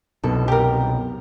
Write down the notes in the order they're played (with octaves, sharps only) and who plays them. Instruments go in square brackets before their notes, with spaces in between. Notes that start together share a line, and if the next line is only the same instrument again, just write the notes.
[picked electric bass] C2 F#2 B2 [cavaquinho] A4
[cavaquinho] G4 A#4